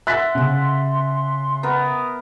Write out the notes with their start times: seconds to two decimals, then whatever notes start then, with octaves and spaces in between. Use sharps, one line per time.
0.07 E5 F#5 C6 F#6 A6 B6
0.35 C#3
1.63 B3 A#4